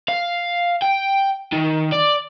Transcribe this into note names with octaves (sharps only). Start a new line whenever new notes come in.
F5
G5
D#3
D5